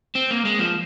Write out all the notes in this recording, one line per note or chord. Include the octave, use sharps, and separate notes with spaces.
C4
A#3
G#3
F3